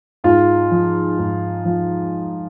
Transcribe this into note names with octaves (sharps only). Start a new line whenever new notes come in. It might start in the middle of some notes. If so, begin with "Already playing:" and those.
G#2 F4
F3
G#2
F3